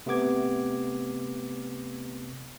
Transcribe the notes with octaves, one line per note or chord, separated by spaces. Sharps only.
C3 A3 B3 D6 G#6